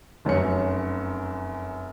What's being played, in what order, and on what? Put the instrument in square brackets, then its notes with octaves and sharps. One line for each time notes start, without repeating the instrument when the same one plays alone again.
[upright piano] F1 F#2 C#4 C#7